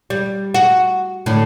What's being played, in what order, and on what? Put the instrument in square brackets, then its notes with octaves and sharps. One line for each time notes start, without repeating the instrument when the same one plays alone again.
[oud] G3
F#4
A2 D3